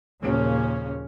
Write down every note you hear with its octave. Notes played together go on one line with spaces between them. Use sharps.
D#2 A#2 C#3 F3 A#3 C#4